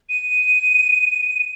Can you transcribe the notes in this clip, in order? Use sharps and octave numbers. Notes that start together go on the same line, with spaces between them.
D#7